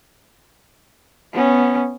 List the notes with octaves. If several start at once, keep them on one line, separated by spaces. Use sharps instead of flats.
B3 C#4